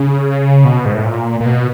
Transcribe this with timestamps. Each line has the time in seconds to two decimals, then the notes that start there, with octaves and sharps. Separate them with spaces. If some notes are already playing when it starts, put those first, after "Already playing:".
Already playing: C#3
0.65 B2
0.86 G#2
0.95 A2
1.06 A#2
1.40 A#2
1.45 B2